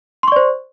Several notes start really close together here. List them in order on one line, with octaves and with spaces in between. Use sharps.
C6 C#6 D5 C5